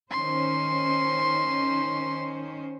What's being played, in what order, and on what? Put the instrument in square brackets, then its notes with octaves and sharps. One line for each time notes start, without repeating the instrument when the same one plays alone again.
[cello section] D#3 C#4 C5 [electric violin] C6